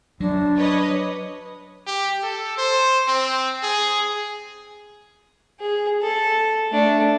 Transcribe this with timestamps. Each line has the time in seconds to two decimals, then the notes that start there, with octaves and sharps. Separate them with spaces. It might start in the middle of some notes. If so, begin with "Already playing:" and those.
0.20 F#2 F#3 D4
0.56 B4 C#5 D#5
1.87 G4
2.23 A4
2.58 C5
3.08 C4
3.63 G#4
5.60 G#4
6.02 A4
6.71 A3 D4